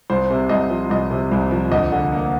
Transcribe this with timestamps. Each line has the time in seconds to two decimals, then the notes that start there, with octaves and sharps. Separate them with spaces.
0.10 C2 C5
0.30 C3
0.49 C2 D#5
0.70 F3
0.90 C2 D#5
1.10 C3
1.32 C2
1.51 F3
1.72 D2 D#5
1.92 D3
2.12 A#3